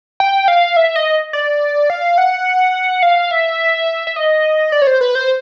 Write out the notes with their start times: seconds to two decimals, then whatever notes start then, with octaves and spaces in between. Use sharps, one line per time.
0.20 G5
0.48 F5
0.76 E5
0.96 D#5
1.33 D5
1.90 F5
2.18 F#5
3.03 F5
3.31 E5
4.07 E5
4.16 D#5
4.72 D5
4.82 C#5
4.87 C5
5.01 B4
5.15 C5